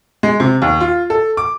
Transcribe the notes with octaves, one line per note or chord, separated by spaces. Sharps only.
G#3
C3
D#2
F4
A4
D6